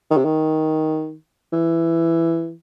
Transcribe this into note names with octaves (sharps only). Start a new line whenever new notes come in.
D#3
C3
D#3
E3